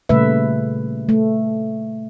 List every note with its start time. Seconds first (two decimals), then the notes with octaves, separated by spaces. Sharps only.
0.09 A#2 C#3 G3 A3 B4 E5
1.09 A3